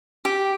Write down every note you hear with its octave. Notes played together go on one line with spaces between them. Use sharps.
G4